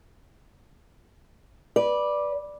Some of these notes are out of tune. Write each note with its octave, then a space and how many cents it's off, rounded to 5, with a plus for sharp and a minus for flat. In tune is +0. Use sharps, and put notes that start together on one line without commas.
B4 -15 D5 +0